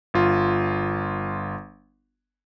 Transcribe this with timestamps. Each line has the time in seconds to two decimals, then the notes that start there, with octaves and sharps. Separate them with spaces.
0.14 G1 F4